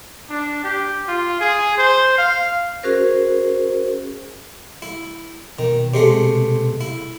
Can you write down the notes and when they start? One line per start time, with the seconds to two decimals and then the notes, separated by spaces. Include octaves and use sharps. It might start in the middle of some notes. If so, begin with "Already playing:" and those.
0.30 D4
0.64 G4
1.08 F4
1.41 G#4
1.78 C5
2.18 F5
2.83 C#4 F#4 G#4 A#4 C5
4.82 E4
5.59 B2 D#3
5.94 C3 G#3 A3
6.81 E4